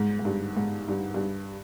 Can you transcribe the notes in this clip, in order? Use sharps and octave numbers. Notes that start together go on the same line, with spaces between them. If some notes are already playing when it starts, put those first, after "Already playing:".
Already playing: G#2
G#2
G2
G#2
G2
G2